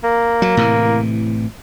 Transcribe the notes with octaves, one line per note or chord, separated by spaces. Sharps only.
A#3
F#3
A2 C3 E3